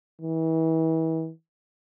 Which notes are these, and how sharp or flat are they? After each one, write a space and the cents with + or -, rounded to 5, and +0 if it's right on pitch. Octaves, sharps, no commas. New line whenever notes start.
E3 -35